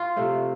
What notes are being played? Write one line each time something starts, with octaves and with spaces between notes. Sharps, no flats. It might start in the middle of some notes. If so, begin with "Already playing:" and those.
Already playing: F4
C3 F3 A3